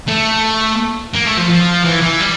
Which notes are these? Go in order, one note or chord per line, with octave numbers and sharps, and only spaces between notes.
A3
A#3
A3
F3
F3
E3
E3
G3